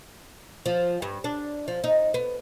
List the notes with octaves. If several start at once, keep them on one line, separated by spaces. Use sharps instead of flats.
F3
G2
D4
F3
D#4
B3